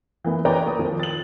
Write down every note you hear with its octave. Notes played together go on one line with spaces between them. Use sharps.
E3 A#3 B3
A#4 B4 C#5 D5 G5 A#5
A#3 D#6
F2 D#3 F3
A6 F#7